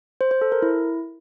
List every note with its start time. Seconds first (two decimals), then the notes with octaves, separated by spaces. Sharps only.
0.21 C5
0.31 C5
0.41 A4
0.52 A#4
0.62 E4